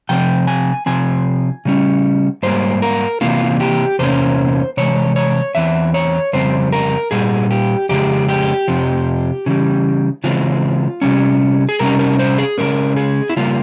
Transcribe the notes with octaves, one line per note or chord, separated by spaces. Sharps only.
C3 F3 C4 G5
G#5
C3 F3 C4 G#5
C#3 G3 C#4
G#2 G3 A#3 C5
A#4
C3 E3 A#3 F4
G4
E2 C3 A#3 C#4 C5
C3 E3 G#3 C#5
C#5
E2 E3 C4 E5
C#5
F2 C#3 G3 C4 C5
A#4
A#2 G3 G#4
G4
F2 C#3 G#3 G4
G4
F2 C3 F3
C#3 E3 G3
C#3 E3 G#3 C4 F4
C3 G3 C#4
G#4
C3 G3 C#4 A#4
A#4
C5
G#4
C#3 E3 G#3 C#4 A#4
G#4
E4
C#3 G3 A#3 F4